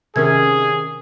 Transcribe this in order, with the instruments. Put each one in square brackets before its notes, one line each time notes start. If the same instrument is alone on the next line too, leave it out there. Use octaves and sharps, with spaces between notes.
[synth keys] C3 D#3 C#4 [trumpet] G#4 [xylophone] A#4 E6 G#6